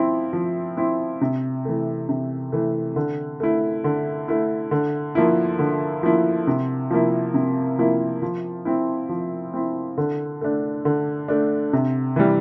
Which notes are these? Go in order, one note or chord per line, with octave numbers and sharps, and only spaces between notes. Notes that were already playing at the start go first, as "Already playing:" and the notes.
Already playing: F3 C4 E4
F3
C4 E4
C3
E3 A3
C3
E3 A3
D3
A3 E4
D3
A3 E4
D3
F3 A#3 E4
D3
F3 A#3 E4
C3
F3 A#3 E4
C3
F3 A#3 E4
F3
C4 E4
F3
C4 E4
D3
A3 D4
D3
A3 D4
C3
E3 G3